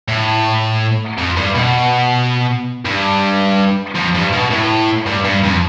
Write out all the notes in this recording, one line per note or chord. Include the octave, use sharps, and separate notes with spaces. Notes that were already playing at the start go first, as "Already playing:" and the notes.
A2
F2
G2
B2
G2
F2
G2
B2
A2
G2
G2
F2